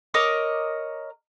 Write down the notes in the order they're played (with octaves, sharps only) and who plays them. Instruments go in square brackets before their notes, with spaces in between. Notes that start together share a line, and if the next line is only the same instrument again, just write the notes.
[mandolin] A#4 C#5 D#5 D6